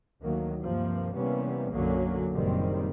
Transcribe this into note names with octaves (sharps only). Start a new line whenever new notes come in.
D2 D#3 F#3 A#3
G2 C3 F3 A#3
C3 E3 G3 A#3 B3 C#4
B1 F#2 D3 F#3 A#3 C#4
F#1 A#2 D#3 G3 C4